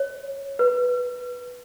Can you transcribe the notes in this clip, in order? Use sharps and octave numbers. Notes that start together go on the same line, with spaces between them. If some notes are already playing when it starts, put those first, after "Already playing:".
Already playing: C#5
B4